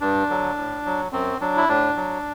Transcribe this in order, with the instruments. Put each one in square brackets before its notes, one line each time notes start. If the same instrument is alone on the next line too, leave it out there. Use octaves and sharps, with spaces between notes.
[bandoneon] G2 D4
D3 F#3
A2
F#3
F#2 C4
F#3 D4
E4
A2 D4
F#3